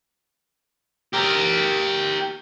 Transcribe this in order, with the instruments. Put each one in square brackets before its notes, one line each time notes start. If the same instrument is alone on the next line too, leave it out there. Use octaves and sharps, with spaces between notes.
[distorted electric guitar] G4 A#4